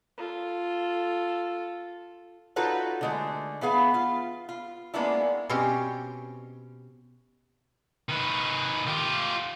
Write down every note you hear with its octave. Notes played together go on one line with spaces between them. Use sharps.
F4 A4
D#4 F4 F#4 A4 B4 C#5
D3 G#3 A3
E3 B3 G#4 F5
F4
F4
G#3 A#3 B3 C#4 D4 E4
B2 C4 C#4 G4 G5
D#3 B4
F4 G4